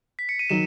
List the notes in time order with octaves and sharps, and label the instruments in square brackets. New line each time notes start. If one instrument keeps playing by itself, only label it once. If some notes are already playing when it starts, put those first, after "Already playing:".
[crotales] B6
C#7
D#7
[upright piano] D#3 F#3 [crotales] E7